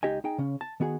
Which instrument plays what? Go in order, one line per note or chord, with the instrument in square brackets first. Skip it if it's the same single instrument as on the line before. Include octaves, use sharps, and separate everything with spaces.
[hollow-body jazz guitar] C#2 D#4 G4 D#5 G#5
D#4 G#4 G5
C#3 C#4
A5
D#3 B3 F#4 G#4